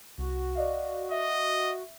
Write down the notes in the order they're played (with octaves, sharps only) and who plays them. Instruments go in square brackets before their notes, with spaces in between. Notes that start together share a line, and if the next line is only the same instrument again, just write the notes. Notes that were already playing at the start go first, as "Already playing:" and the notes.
[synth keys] C2 [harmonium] F#4
[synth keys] D5 D#5 F5
[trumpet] D#5 [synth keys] E5